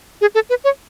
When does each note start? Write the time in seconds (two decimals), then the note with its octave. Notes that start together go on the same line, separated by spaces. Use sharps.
0.21 G#4
0.35 A4
0.50 B4
0.64 C#5